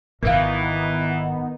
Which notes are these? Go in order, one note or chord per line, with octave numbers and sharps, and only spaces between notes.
G#1 D#3 E3 B3 D#4 A#4 F5